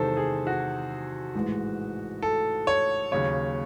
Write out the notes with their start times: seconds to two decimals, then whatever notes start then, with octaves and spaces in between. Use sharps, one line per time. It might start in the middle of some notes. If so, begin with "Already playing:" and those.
Already playing: E2 C3 D#3 G#3 A4 C5
0.17 G#4
0.47 F#4
1.35 A1 G#2 E3 G#3
2.22 A4
2.67 C#5
3.11 D#2 C#3 F#3 C#5